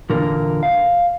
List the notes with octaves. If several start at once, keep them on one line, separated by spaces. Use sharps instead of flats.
E2 A#2 D3 A#3 A#4
F5